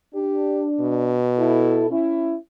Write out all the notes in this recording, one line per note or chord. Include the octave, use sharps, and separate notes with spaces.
D4 G4
B2
E4 A4
C#4 E4